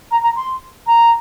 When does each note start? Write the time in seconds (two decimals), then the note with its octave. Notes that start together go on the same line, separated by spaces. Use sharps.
0.11 A#5
0.23 A#5
0.36 C6
0.87 A#5